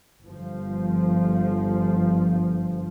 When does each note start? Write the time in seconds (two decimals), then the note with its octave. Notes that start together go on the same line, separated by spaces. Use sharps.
0.24 G1 F3